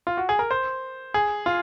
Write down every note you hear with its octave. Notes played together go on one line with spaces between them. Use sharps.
F4
F#4
G#4
A#4
C5
G#4
F4